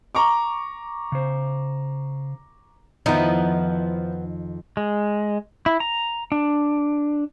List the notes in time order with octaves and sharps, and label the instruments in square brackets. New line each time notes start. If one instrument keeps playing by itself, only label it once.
[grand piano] A#5 C#6 D6
[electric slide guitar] C#3 C5
[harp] F2 D#3 [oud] F3 E4 [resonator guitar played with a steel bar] B3 D#4
[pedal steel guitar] G#3
E4
A#5
D4